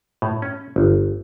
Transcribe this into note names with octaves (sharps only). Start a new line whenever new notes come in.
A2
C#4
G1